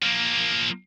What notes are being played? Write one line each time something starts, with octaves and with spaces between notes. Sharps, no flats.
F3 A#3